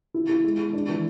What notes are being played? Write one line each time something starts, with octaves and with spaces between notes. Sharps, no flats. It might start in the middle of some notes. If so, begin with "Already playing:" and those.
E4
E4
G#3
G#3
D4
E3